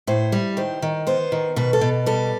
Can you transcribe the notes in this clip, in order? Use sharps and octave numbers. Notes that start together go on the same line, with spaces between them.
A2 C5
G3
D#3 C5
D#3
B3 C5
D#3
B2 B4
A4
B2
G3 A4